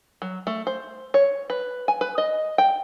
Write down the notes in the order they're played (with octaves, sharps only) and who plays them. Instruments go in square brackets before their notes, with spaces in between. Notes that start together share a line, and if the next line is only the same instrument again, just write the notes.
[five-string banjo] F#3
A3
C5
C#5
B4
G#5
B4
D#5
G5